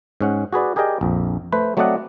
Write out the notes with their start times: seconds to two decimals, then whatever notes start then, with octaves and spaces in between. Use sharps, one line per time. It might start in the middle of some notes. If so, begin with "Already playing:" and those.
0.21 G#2 C#4 F#5
0.53 F#4 G#4 B4 D5
0.76 G4 G#4 A#4 D5 D#5 G5
1.01 A#1 F2
1.52 A3 B4 C5
1.77 F#3 A3 C4 D5 D#5 F#5